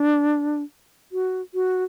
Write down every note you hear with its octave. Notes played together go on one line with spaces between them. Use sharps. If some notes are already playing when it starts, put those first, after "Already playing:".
Already playing: D4
F#4
F#4